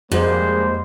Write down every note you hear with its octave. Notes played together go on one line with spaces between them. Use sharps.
F2 G#2 G3 G#3 A#3 C5